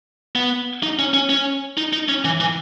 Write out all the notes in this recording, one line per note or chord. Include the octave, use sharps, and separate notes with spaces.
B3
D#4
C#4
C#4
C#4
D#4
D#4
C#4
E3
E3